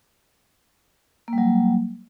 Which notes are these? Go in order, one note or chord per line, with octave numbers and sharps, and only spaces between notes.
F#3 G3 A#3